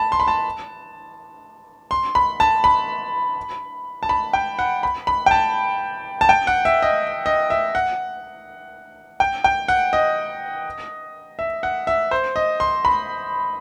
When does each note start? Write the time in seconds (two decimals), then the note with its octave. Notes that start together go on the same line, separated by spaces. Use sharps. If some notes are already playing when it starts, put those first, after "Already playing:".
Already playing: A5 B5
0.12 C6
0.20 B5
0.28 A5
1.91 C6
2.15 B5
2.40 A5
2.64 B5
4.03 A5
4.09 B5
4.33 G5
4.59 F#5
4.83 B5
5.07 B5
5.26 G5
5.31 A5
6.21 A5
6.29 G5
6.47 F#5
6.65 E5
6.82 D#5
7.26 D#5
7.50 E5
7.75 F#5
9.20 G5
9.44 G5
9.68 F#5
9.93 D#5
11.39 E5
11.63 F#5
11.87 E5
12.11 C5
12.36 D#5
12.60 C6
12.85 B5